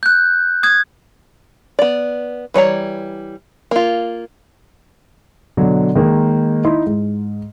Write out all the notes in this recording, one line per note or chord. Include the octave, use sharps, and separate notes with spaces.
F#6 G6
D#6 G#6
B3 D5
E3 G3 C#5 A#5
A#3 F4
B2 D3 F#3
D#3 G#3 A#3
D#4 E4 C6
G#2